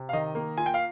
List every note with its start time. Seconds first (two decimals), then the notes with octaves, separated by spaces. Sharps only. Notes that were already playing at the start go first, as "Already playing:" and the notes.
Already playing: C3
0.09 F5
0.13 D#3 D#5
0.35 A#3
0.58 F4 G#5
0.66 G5
0.74 F5